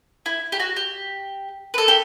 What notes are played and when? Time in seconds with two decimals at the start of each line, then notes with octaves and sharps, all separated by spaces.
0.26 E4
0.52 G4
0.60 F#4
0.76 G4
1.74 B4
1.78 A4
1.88 G4